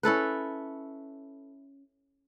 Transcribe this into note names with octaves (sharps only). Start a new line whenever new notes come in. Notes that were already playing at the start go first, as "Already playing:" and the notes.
C#4 E4 A4 B4